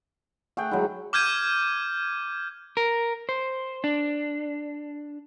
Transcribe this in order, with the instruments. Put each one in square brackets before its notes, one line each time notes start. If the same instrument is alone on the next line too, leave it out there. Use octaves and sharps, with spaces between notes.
[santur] A3 G#4 G5 [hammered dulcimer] F#5
[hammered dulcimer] F#3 G#3 [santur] E4
[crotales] D6 F6 G6 G#6 D#7
[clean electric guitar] A#4
C5
D4